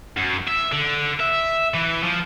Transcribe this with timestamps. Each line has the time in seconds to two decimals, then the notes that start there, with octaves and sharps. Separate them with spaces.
0.17 F#2
0.48 E5
0.72 D3
1.20 E5
1.74 E3
2.03 F3